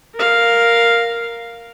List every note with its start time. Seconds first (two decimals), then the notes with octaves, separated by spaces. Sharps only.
0.15 A#4 F5